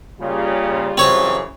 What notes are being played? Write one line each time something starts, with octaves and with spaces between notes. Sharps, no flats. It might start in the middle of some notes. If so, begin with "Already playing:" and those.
C#3 G3 A#3 F4
F#2 C#3 E3 C4 C#5